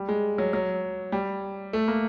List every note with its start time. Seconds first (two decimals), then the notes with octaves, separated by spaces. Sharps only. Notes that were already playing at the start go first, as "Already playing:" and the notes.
Already playing: G3
0.09 G#3
0.38 F#3
0.53 F#3
1.12 G3
1.73 A3
1.88 A#3